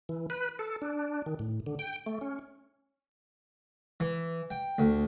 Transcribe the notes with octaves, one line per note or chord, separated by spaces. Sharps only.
E3
B4
A4
D4
D#3
A2
D3
G5
A3
C#4
E3
G5
D2